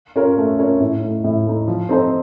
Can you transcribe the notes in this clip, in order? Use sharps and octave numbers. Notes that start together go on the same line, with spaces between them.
C#4 F4 A#4 C#5
A3
C#4 F4 A#4 C#5
A2
A3 D#4
A2
A3 D#4
F3
C4 D#4 A4 C5